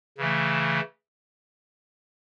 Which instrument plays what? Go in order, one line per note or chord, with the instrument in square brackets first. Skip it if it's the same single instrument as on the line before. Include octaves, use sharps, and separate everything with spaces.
[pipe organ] C#3 E3 A3